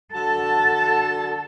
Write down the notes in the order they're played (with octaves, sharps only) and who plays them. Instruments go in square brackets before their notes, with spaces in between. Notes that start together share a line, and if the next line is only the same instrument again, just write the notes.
[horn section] D3 F#4 A5 [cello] A4